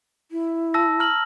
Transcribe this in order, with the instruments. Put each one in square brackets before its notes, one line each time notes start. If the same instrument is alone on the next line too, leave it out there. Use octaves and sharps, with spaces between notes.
[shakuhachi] E4
[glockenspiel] A5 E6 A#6
A#5 F6 F#7